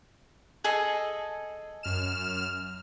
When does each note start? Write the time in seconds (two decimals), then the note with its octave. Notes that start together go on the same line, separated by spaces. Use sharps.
0.64 G#4 A4 D#5
1.83 F#2 F6 E7